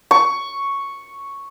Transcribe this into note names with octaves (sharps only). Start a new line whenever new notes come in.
C#6